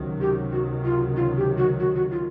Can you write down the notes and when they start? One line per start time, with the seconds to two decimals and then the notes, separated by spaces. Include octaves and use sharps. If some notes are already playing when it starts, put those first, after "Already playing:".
Already playing: C#2 C3 D#3 F#3
0.21 G4
0.52 F#4
0.84 F4
1.16 F4
1.37 G4
1.58 F#4
1.79 F#4
1.95 F#4
2.11 F4